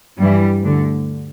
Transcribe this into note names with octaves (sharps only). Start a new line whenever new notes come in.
G2 E3 G3
D2 D3